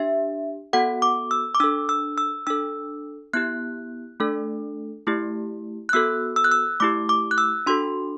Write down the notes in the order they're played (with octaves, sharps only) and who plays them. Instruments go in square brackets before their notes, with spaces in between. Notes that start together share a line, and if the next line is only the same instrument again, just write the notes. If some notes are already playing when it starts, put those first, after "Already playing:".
Already playing: [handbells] D4 G4 E5
B3 F#4 A4 F#5
D6
E6
D6
D4 A4 E6
E6
E6
D4 A4 E6
B3 E4 G4 F#6
A3 D4 A4
A3 E4 G4
F#6
B3 F#4 A4 E6
E6
F#6
E6
A3 E4 G4 D6
D6
F#6
E6
D4 F#4 A4 C6